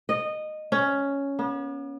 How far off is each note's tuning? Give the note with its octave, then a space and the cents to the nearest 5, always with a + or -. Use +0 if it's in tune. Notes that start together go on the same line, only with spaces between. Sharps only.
D#5 -15
C#4 +5
B3 -40